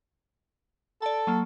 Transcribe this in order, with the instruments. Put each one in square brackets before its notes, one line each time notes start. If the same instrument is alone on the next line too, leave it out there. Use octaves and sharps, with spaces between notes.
[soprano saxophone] A4 [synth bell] D5 A5
[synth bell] F#3 A#3